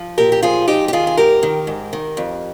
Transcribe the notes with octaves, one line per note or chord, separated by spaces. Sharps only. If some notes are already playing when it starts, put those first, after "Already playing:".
Already playing: F3
A#2 G4 A#4
G4
F3 F4 G#4
G#2 D#4 G4
G4
D#3 F4 G#4
G#4
G#2 G4 A#4
D#3
G#2
D#3
F2